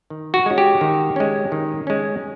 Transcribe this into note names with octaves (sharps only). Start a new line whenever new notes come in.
D#3
F#4
G#3 C#4
G4
D#3
G#3 C#4
D#3
G#3 C#4